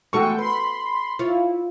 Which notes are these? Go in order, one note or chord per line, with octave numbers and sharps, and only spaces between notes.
E3 G#3 A3 F#4 A4 G5 C#6
B4 B5 C6
E4 F4 C#5